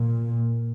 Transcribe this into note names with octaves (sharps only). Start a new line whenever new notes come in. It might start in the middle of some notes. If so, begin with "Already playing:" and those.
Already playing: A#2